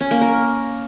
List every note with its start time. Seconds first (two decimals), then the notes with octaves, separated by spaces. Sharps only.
0.01 C#4
0.11 A#3
0.21 A#4